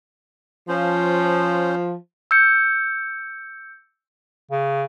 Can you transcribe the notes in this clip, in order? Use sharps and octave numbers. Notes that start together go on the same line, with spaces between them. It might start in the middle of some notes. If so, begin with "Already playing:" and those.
F3 C#4 C5
E6 G6 C#7
C#3